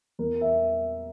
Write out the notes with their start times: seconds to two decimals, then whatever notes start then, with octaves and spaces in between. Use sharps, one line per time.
0.19 E2 A#4
0.41 E5